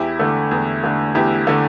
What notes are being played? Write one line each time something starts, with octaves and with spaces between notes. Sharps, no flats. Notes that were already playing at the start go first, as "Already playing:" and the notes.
Already playing: E2 E4 G4
D3 A3
E2
D3 A3
E2 E4 G4
D3 A3